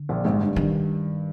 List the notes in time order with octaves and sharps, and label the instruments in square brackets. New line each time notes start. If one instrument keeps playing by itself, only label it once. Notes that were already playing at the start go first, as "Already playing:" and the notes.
Already playing: [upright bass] D3
[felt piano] A#1 A#2
G#1 G#2
G2
[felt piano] G2 [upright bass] D#3